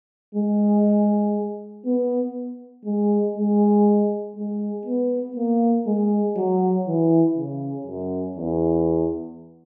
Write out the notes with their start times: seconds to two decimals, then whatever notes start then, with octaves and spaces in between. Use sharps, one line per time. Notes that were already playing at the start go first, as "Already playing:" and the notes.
0.35 G#3
1.85 B3
2.85 G#3
3.36 G#3
4.36 G#3
4.86 B3
5.36 A#3
5.86 G#3
6.36 F#3
6.87 E3
7.37 C#3
7.87 F#2
8.37 E2